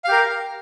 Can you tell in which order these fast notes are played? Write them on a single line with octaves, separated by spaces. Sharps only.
F5 G4 A#4